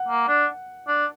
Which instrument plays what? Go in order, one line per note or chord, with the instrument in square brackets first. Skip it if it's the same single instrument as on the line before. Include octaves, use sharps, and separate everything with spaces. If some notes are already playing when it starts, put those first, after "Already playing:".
Already playing: [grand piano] F#5
[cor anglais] A#3
D4
D4